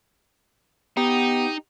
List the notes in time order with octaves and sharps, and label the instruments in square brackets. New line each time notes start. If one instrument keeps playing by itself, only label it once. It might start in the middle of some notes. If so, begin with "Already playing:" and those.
[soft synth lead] B3 [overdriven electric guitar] D#4 [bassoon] G4